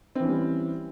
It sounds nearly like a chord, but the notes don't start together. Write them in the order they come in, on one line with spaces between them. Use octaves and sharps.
C4 E3 C#4 G3